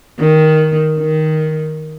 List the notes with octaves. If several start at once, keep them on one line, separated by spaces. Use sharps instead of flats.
D#3
D#3